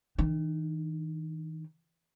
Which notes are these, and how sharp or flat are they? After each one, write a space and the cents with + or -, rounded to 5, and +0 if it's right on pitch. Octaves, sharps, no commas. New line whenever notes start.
D#3 +45 D#4 -30